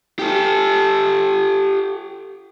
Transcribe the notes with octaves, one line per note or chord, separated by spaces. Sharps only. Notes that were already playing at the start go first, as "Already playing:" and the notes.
G4 A4